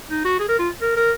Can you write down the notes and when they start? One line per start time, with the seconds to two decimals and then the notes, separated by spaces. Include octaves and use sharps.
0.10 D#4
0.25 F#4
0.39 G#4
0.49 A#4
0.59 F4
0.82 A#4
0.97 A#4